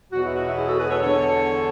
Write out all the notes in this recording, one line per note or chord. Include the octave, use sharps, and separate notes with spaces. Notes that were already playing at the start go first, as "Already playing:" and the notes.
E2 B2 F#3 B3 F#4
E4
F#4
E4
E4 G#4
F#4 A4
G#4 B4
A4 C#5
E2 D3 G#3 A4 C#5